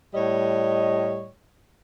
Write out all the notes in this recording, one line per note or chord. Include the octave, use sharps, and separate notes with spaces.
A2 G3 C#5 D#5